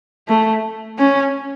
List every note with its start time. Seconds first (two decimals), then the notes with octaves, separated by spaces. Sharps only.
0.28 A3
0.99 C#4